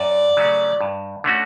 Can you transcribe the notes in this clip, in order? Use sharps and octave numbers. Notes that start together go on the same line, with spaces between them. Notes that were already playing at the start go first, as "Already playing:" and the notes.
Already playing: F#2 D5
C#3 F#3 A3 C#4
G2
D3 A3 C#4 F#4